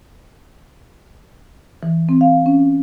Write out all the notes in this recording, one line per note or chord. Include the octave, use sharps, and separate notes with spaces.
E3
C4
F5
C#4